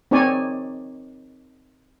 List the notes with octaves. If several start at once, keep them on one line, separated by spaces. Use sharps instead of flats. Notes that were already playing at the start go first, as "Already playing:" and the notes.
C4 D#4 C#5 D5 G#5